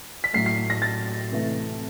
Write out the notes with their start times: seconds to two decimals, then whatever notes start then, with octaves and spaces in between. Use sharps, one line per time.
0.24 B6
0.33 A2 F#3 A3 C7
0.46 C7
0.70 A#6
0.82 A6
1.31 C3 E3 A3